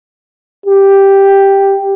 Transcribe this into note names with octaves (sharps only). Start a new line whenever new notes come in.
G4